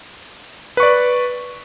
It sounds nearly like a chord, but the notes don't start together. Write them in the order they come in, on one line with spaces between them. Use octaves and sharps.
B4 C#6 D5